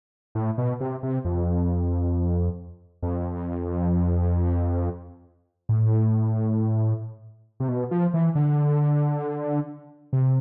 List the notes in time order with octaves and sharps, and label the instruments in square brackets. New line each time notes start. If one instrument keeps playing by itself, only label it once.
[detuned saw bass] A2
B2
C3
C3
F2
F2
A2
C3
B2
F3
E3
D3
C3